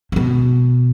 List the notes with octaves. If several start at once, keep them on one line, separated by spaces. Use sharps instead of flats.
C3
B2